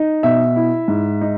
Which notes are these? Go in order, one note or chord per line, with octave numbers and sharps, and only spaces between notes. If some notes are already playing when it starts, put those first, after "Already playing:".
Already playing: D#4
B2 E5
E4
G#2
D#4